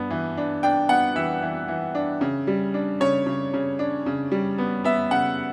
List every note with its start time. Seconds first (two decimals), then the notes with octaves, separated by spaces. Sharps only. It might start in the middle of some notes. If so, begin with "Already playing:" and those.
Already playing: G2 B3 D4
0.10 E3
0.37 D4
0.63 D4 G5
0.89 B3 F#5
1.16 E3 E5
1.42 E3
1.68 E3
1.95 D4
2.21 C#3
2.47 G3
2.74 D4
3.00 C#3 C#5
3.26 C#3
3.54 C#3
3.79 D4
4.06 C#3
4.31 G3
4.58 B3
4.84 B3 E5
5.11 C#3 F#5